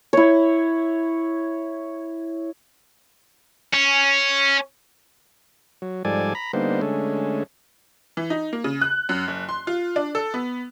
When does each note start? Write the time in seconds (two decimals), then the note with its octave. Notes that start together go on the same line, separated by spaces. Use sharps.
0.13 E4 C#5
3.73 C#4
5.82 F#3
6.05 G#2 F3 G3 A4 D5 G#5
6.35 A#5 B5
6.53 D3 G3 A#3 B3 D#4 C5
6.81 D3 G#3 A3 C#4
8.17 E3
8.30 D#4
8.53 A#3
8.64 C#3
8.81 F#6
9.09 F#2
9.28 F#1
9.49 C6
9.67 F4
9.96 D4
10.15 A4
10.34 B3